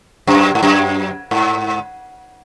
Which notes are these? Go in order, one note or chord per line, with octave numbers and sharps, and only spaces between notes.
F#2
G#2
F#2
G#2